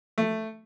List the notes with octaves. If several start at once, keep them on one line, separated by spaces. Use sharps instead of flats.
A3